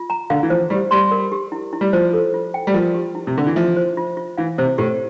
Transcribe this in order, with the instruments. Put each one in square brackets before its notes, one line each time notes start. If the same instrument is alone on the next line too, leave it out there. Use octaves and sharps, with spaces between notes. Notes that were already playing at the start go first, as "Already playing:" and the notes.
Already playing: [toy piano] F4
A#5
[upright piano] D3 [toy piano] F5
[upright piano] E3
[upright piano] F3 [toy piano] C5
[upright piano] G3 [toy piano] G4
[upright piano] G3 [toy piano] C6
[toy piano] A#4
G4
E4
E4
[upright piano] G3
[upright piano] F3 [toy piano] C5
[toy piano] A4
F4
G5
[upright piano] G3
[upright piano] F3 [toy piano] A#4
[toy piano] G4
E4
[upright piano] C3
[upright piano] D3 [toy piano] E4
[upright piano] E3
[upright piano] F3 [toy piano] E5
[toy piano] C5
F4
F4
[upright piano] E3 [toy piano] F5
[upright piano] C3 [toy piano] C5
[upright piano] A2 [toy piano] G4